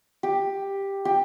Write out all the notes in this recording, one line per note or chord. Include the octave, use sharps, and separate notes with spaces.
G4
G4